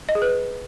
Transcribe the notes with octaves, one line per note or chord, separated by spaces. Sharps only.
D#5
G#4
B4